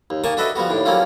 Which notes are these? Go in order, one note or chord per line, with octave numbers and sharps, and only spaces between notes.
D#2
D#3 A#3 G#5 A5 C#6
D4 F#4 A4 B4 D#5 E5
F3 G3 B3 F#4
D#2 A2 D4
F#3 G3 A#3 C4 C#4 F4